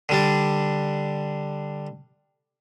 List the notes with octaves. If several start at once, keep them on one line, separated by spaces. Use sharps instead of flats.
D3 G3 D4